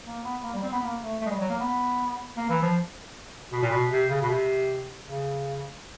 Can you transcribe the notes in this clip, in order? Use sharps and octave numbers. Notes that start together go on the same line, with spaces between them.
A#3
B3
A#3
G3
C4
B3
A#3
A3
A3
G#3
G3
F#3
A#3
B3
A#3
E3
F3
B2
A#2
B2
C3
C#3
B2
C3
C#3